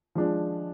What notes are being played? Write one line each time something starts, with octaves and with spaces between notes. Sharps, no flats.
F3 G#3 D4